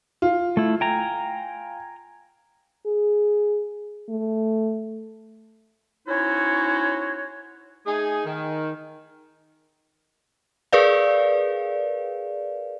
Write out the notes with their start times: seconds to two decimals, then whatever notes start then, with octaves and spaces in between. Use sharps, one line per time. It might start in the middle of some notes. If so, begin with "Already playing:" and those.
0.22 F4
0.57 A3 E4
0.81 G5 G#5 A#5
2.86 G#4
4.10 A3
6.07 C#4 D#4 E4 F#4 C5 C#5
7.86 A3 D#4 G#4
8.25 D#3
10.72 G#4 A#4 B4 D5 F5